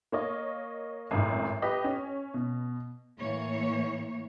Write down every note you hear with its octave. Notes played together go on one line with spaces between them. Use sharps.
A#3 C#5 D#5
G#1 F#2 A2
G4 B4 D#5 B6
C#4
B2
A2 E3 A#3 C#5